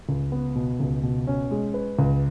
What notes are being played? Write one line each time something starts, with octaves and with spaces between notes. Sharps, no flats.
C#2
B3
B2
C#2
B2
C#4
G#3
B4
C#2